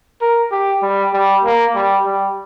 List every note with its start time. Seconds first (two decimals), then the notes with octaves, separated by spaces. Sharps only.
0.21 A#4
0.51 G4
0.82 G3
1.13 G3
1.44 A#3
1.75 G3
2.06 G3